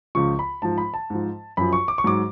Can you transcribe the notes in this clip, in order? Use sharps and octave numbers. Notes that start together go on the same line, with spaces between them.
C#2 C#3 F3 C#6
B5
G#2 F3 A5
B5
A5
G#2 F3
F#2 F3 B5
C#6
D6
C#6
G#2 F#3 D6